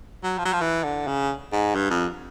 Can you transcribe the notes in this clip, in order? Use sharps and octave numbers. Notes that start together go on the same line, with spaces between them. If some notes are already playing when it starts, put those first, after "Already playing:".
F#3
F3
F#3
F3
E3
D3
C#3
G#2
G2
F2